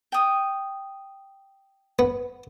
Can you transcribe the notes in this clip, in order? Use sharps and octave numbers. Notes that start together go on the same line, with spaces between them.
G5 D#6
B3